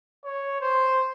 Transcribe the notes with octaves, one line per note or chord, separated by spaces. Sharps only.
C#5
C5